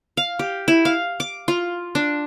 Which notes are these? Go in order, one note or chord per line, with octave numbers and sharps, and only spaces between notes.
F5
G4
E4
F5
D6
F4
D4